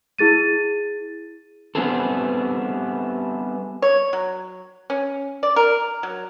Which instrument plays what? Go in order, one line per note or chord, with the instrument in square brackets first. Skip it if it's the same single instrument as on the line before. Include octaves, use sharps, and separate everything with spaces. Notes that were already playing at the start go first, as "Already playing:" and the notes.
[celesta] E4 G#4 A6 D#7
[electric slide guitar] G3 B3 C4 E4 G#4 A4
[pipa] C#5
F#3
C#4
D5
A#4
F#3